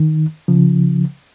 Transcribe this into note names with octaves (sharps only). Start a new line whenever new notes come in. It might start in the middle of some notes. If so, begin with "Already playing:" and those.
Already playing: D#3
C#3 F3